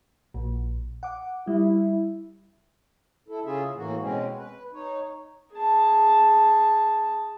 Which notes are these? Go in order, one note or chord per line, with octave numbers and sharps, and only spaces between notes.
A#1 A#2
F#5 D6
G3 E4
E4 A4
C#3 C#4 F4 G#4 E5
A2 E3 A#3 F#4
B2 G#3 C4 C#4
B4
D#4 C#5
G#4 A5